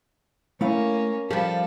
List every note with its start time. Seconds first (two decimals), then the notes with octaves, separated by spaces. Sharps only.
0.61 A3 A#3 C#4 E4 F5
1.31 F3 G3 G4 A4